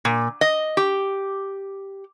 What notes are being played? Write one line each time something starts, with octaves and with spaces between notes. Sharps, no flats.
A#2
D#5
G4